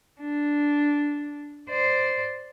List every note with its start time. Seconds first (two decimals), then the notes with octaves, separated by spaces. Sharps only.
0.20 D4
1.69 C5 D5